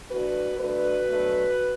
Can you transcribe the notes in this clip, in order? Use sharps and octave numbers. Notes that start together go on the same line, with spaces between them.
E3 A3 D4 F#4 B4
D3 A3 D4 F#4 B4
B2 F#3 A3 D4